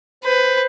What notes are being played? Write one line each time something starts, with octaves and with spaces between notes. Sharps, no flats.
B4 C5